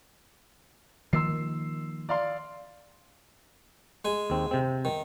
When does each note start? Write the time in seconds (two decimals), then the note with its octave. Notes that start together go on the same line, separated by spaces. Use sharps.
1.13 D#3 F3 A#3 C6 E6 C7
2.09 D5 F5 C6
4.05 G#3 G#5
4.30 D#2 C4
4.51 C3 C4
4.85 D#3